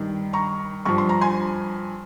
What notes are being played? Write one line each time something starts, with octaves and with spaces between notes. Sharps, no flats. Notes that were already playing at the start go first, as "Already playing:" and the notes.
Already playing: G2 D#3
A#5 C#6
G2 F3 C#6
C6
A#5
G#5 C6